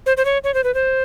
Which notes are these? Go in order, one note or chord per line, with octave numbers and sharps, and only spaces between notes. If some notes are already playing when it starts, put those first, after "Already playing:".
C5
C5
C#5
C#5
C5
B4
C5